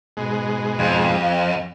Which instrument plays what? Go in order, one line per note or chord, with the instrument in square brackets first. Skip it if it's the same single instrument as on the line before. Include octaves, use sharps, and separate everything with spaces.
[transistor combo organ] G#2 B2 G#3
[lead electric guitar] F2